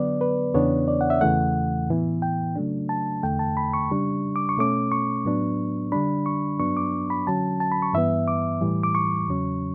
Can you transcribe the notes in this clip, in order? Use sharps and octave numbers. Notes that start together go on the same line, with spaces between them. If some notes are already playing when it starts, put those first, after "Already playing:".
Already playing: D3 F#3 B3 D5
B4
E2 C#3 E3 B3 D4 C#5
D5
F#5
E5
E2 C#3 E3 A3 F#5
A2 E3 B3
G5
C#3 F#3 A3 D4
A5
E2 D3 A3 G5
A5
B5
C#6
C#3 G3 D4
D6
C#6
B2 A3 C#4 D6
C#6
A2 F#3 B3 D4
D3 G3 D4 B5
C#6
G2 F#3 B3 D4 C#6
D6
B5
D3 F#3 C#4 A5
A5
B5
C#6
G2 E3 B3 E5
D6
A2 E3 G3
D6
C#6
E2 C#3 F#3 C#4